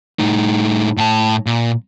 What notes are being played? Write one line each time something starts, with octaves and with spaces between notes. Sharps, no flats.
A2 D#4
A2 A5
A#2